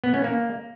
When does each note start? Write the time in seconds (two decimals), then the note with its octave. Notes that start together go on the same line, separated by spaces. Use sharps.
0.04 B3
0.14 C#4
0.24 A#3